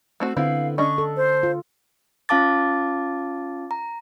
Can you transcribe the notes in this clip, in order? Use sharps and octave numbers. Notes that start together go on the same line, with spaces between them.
A3 C4 F#4
D3 B3 C4 E4 F5
C#4 D4 D#5 C#6
A4
C5
F4
C#4 F4 F5 A5 D6 A6
A#5